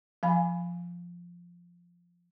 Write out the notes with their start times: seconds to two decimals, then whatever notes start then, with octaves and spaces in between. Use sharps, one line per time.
0.23 F3 F5 G#5 B5